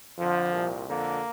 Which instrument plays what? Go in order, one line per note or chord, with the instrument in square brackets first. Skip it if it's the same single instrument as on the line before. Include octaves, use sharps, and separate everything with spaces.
[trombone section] F2 D3 F3
C2 A#2
F2 D3 A#3